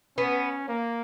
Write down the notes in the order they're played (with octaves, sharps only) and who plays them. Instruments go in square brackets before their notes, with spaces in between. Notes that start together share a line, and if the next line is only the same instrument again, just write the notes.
[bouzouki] B3 [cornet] C#4
[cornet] A#3